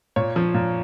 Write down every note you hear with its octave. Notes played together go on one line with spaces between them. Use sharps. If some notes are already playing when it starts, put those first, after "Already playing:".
A#2 C#5
F3
A#2